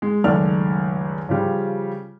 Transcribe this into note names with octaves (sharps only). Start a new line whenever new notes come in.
G#3
C#2 F#2 D#3 A3 D5 F6
C#3 F3 G3